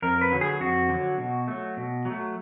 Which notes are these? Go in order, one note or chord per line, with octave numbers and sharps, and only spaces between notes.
F2 A#4
B4
D3 F#3
G#4
F2 F#4
D3 F#3
B2
F#3 A3
B2
F#3 A3